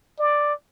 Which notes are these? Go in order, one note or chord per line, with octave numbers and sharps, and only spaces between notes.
D5